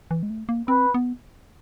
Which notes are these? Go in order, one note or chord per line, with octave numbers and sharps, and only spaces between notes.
E3
G#3
A3
A#3
C4 B4
B3